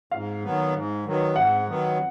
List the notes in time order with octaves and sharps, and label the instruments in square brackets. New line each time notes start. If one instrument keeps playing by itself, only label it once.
[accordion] G#2 [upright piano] F5
[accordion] D#3 F#3 B3
G#2
D#3 F#3 B3
[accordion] G#2 [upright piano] F#5
[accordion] D#3 F#3 B3